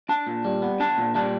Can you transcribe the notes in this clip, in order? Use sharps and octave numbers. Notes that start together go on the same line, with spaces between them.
D4 A5
A#2
G3
B3
D4 A5
A#2
G3 A5